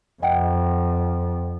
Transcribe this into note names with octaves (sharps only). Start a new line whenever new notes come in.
F2 D#5 F#5 G5